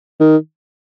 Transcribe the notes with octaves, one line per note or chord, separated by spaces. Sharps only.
D#3